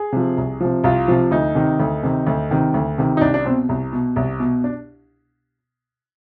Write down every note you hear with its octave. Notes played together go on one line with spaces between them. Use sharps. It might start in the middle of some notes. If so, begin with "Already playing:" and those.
Already playing: G#4
C3 F3
C2
C3 F3
C2 F4
C3 F3
D2 D#4
C3 D#3
D2
C3 D#3
D2
C3 D#3
D2
C3 D#3
D#4
C2 D4
D4
B2 C4
C2
B2
C2
B2
D4